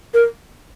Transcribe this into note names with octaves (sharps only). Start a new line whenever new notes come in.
A#4